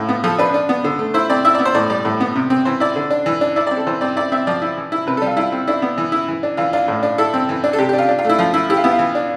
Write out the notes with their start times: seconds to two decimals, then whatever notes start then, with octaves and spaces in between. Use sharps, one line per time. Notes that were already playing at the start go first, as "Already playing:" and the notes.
Already playing: A2 F4
0.09 B3
0.24 F3 A4
0.39 D4 B4
0.54 D4
0.69 B3
0.84 D3
0.99 A3
1.14 E4 C5
1.30 C4 D5
1.45 E4 E5
1.54 D5
1.59 B3
1.65 C5
1.75 A2 D5
1.90 G3 D5
2.05 A2
2.20 B3
2.36 C3
2.50 C4
2.65 E3 C5
2.80 E4 D5
2.96 D3
3.11 D4
3.26 E3
3.41 D4
3.56 E4 D5
3.67 D5
3.71 C4
3.77 A4
3.87 E3 C5
4.01 C4 D5
4.16 E4 D5
4.32 C4 E5
4.47 F3 D5
4.62 E4
4.77 E3
4.92 E4
5.07 C3 B4
5.17 A4
5.22 G3 F4
5.37 E4 F4
5.52 C4
5.67 D4 E4
5.82 B3
5.98 E3
6.12 E4
6.28 E3
6.43 D4
6.57 E3 F4
6.73 D4 F4
6.88 A2
7.03 D4
7.18 E4 A4
7.34 C4
7.49 E3
7.64 D4
7.73 A4
7.79 C3 G4
7.89 G4
7.93 D4
7.98 F4
8.09 D4
8.19 F4
8.25 A3 E4
8.38 F3 F4
8.54 E4
8.70 E4 G4
8.77 F4
8.84 B3 E4
8.91 F4
8.99 E3
9.15 D4